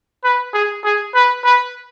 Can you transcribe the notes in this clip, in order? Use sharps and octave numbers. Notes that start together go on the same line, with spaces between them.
B4
G#4
G#4
B4
B4